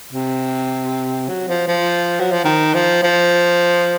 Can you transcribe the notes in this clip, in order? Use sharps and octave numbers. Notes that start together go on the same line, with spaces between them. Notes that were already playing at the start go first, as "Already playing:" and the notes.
C3
F#3
F3
F3
F#3
F3
D#3
F3
F3